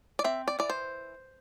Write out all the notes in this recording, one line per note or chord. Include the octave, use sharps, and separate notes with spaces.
D5
C4 E5
D5
E3 D5
C5